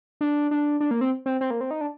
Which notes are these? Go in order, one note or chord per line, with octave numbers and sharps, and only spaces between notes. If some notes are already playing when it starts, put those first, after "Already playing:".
D4
D4
D4
A#3
C4
C4
C4
A#3
C4
D#4
D4